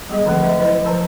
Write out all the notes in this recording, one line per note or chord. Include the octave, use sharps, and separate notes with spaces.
G3 B3 G#4 D#5
D3 D#3 F3 F#3 A3 C4
F#3 D#5 E5
E4 B4 C5 D#5
F3 A#4 C5 A5 A#5 C6